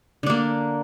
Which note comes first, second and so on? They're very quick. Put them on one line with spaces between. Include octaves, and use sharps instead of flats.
D3 D4 A#3